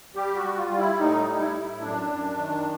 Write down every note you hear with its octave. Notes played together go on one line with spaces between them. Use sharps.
G3 G4
F#4
G3
F4
G3
E4
A2 D#4
G3
E4
A2
F#2 D4
F#2
D#3